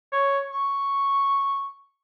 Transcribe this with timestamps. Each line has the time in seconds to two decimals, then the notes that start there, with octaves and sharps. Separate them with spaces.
0.12 C#5
0.52 C#6